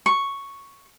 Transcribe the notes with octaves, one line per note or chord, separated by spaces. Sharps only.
C#6